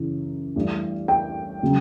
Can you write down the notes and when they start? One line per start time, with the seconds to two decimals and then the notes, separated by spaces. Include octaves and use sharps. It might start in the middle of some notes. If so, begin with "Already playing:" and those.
Already playing: F#2 C#3 E3
0.55 G2 E3 A3
1.08 G5
1.63 C#3 F#3